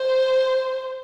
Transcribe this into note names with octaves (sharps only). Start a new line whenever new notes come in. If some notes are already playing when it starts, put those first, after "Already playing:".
Already playing: C5